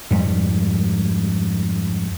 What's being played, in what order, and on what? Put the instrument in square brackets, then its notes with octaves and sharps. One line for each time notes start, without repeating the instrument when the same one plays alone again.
[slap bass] F2 G#2 G3